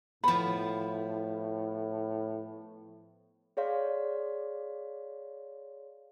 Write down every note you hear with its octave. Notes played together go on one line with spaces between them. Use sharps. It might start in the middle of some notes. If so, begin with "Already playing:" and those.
A2 F3 B3 B5
G#4 C#5 D5 F5 C6